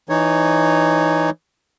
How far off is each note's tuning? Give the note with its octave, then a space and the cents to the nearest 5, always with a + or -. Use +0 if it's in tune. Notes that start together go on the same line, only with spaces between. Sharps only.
E3 +0 D#4 -15 C#5 +0